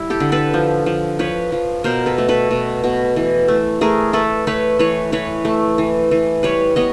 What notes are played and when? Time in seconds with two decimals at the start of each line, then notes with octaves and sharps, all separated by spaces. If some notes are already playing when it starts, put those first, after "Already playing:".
Already playing: G3 E4
0.10 G4 A4
0.20 D3
0.32 A4 B4
0.54 F3
0.86 F3
1.19 F3 B4 C#5
1.52 F3
1.84 B2 A#4 C5
2.06 A4 B4
2.18 A3
2.29 A4 B4
2.51 B2
2.84 B2
3.16 E3
3.48 A3
3.81 A3 G#4 A#4
4.13 A3 A4 B4
4.47 A3 B4 C#5
4.79 E3 B4 C#5
5.12 E3 B4 C#5
5.45 A3
5.78 E3
6.11 E3
6.43 G3 B4 C#5
6.76 B3 C#5 D#5